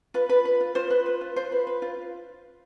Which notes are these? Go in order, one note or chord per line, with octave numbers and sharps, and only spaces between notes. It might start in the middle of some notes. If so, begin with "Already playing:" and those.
F4 B4
B4
B4
F4
F4 C5
B4
B4
F4
F4 C5
B4
B4
F4